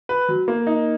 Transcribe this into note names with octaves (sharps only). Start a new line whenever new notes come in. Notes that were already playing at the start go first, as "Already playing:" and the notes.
B4
F#3
A#3
D#4